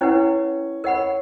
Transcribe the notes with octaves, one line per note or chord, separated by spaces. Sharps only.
C#4 E4 B4 C#5 F#5
A#4 C#5 D#5 F#5 B5